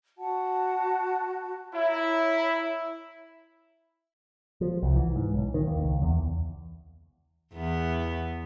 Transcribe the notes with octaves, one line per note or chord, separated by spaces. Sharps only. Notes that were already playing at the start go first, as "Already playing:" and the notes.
F#4 F#5 A5
E4 C#5 A#5
F3
C2
E3
G#2
B1
D#3
D#2
C#2
E2
E2 B3